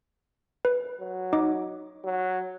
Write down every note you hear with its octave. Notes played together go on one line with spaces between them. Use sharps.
B4
F#3
D#4 D#5 D6
F#3